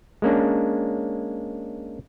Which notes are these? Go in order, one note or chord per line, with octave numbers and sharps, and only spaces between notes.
G#3 A#3 C#4 D4